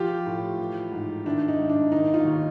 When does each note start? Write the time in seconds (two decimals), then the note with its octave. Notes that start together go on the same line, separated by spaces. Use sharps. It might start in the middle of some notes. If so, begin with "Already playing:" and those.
Already playing: F3 F4 G4
0.27 A2
0.60 E3
0.92 G#2
1.26 D#3 D4 E4
1.48 D#4
1.59 G#2
1.69 D4
1.92 D#3 D#4
2.14 D#4 F4
2.25 D#2